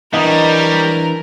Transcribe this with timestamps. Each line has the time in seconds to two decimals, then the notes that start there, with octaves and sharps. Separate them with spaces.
0.14 E3 G3 D4 A#4 C#5 D#5